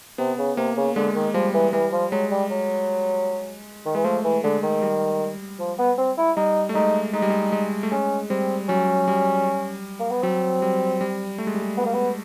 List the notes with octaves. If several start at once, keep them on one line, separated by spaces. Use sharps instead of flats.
C3 B3
C#3
C3 A#3
C#3
D3 G#3
D#3
F3 G3
E3
E3 G3
F3
F#3 G#3
G3
F#3
D#3
E3 G#3
F3 A3
E3
D3 G#3
D#3
G3
F3
B3
C4
E4
G3 D#4
A3
G#3 D#4
G#3 D#4
G3
G#3
G#3
A3
G#3 C#4
G3 C4
F#3 C#4
G3
A#3
B3
F#3 C4
G3
G3
A3
G#3
G3
G#3
B3
A#3
B3